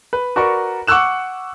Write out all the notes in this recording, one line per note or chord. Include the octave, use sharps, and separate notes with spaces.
B4
F#4 A#4 B4 D5 C#6
F#5 C#6 D6 E6 F#6 E7